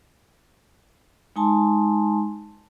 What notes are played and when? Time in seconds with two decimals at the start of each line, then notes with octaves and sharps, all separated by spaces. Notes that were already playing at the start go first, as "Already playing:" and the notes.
1.36 G#3 D#4 G#5 A5 C6